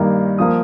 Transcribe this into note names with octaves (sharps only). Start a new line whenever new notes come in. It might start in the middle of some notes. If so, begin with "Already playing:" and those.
Already playing: G2 D#3 A#3
F3 A#3 D#6